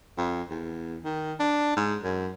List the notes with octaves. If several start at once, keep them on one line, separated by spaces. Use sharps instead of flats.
F2
E2
D#3
D4
G#2
F#2